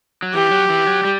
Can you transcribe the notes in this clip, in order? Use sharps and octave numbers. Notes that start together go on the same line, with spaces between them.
F#3
E3 G4
F#3
E3
F#3
G3